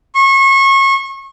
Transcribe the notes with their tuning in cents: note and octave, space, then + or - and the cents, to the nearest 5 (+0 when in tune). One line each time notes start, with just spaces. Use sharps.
C#6 -30